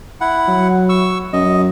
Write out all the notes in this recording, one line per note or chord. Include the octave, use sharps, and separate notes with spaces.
E4 F#5
F#3
C#6 E6
F#2 D#5